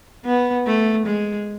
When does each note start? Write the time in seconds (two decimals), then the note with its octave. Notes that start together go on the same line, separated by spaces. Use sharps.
0.25 B3
0.66 A3
1.06 G#3